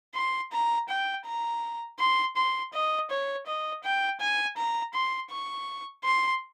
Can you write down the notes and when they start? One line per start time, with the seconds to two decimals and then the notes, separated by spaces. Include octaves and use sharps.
0.15 C6
0.52 A#5
0.89 G5
1.26 A#5
1.99 C6
2.37 C6
2.74 D#5
3.10 C#5
3.47 D#5
3.84 G5
4.21 G#5
4.57 A#5
4.94 C6
5.31 C#6
6.04 C6